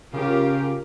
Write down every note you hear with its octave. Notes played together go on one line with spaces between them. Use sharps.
C#3 C#4 F4 G4 A#4